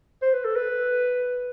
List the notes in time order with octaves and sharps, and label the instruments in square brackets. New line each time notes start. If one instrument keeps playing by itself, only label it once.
[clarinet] C5
B4
A4
B4